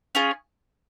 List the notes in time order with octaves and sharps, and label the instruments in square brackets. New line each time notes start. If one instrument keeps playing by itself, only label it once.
[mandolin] C#4 F4 G#4